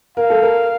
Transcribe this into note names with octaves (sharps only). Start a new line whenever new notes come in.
A#4 F5
A4
A#4